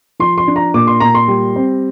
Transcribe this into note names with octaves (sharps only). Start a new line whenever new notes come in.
F3 C6
C6
D4
A#5
A#2 D6
C6
A#2 A#5
C6
G3
C4